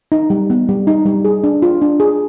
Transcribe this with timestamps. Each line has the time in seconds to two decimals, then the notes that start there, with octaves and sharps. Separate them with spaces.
0.12 D#4
0.30 G3
0.50 B3
0.69 G3
0.87 D#4
1.06 G3
1.25 G#4
1.44 D4
1.62 F4
1.82 D4
2.00 G#4